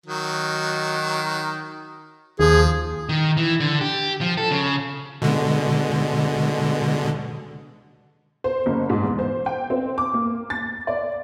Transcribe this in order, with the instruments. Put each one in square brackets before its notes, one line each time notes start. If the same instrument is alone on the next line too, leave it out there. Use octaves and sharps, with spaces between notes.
[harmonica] D#3 F#3
[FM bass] D#2 [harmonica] F3 [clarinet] G#4
[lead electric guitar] D#3
E3
D3
G4
F3
A4
C#3
[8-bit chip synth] B2 D3 G#3
[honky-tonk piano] C5
F#1
G#2
E2
C5
G5
C4
D6
A#3
A6
D5